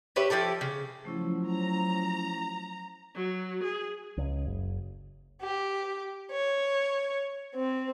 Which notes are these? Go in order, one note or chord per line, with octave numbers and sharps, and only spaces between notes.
G4 B4 C#5 E5
F3 E4 G4 A4
C#3
F3 F#3 A3 C#4 E4
A#5
F#3
G#4
C#2
F#1
G4
C#5
C4